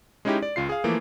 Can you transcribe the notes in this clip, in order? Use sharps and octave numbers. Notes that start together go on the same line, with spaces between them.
G#3 C#4 D#4 E4 G4
D5
C#2 F4 C7
G#4 F5
E3 F3 A3 A#3